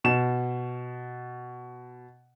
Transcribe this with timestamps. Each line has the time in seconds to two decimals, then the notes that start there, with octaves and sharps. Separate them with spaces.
0.04 B2 E7